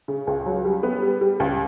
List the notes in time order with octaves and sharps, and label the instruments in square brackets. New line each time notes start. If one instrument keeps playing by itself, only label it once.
[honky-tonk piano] C#3
C#2
F#3
G3
B3
G3
G3
C#2